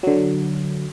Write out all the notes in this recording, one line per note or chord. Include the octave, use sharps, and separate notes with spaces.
D3 F#3